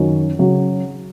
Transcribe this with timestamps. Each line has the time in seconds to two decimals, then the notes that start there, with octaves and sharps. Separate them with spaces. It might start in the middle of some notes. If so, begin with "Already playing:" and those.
Already playing: F#2 D#3 F#3 C#4
0.39 C#3 F#3